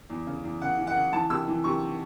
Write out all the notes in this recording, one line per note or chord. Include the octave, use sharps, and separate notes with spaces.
E2
C#3
E2
C#3 F#5
E3
F#5
C#3
E3 A5
C3 E6
E3
C3 C#6